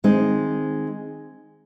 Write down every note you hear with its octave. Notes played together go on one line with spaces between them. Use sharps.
D#3 G#3 C4 D#4